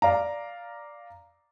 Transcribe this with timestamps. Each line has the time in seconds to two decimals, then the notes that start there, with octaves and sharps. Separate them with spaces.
0.02 D5 F5 A#5